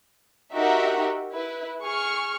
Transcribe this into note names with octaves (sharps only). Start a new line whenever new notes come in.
D#4 F#4 G4 A#4 E5 F#5
E4 B4
G#4 C#6 F6